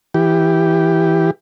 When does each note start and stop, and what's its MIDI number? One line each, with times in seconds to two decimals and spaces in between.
0.14 1.31 52
0.14 1.31 67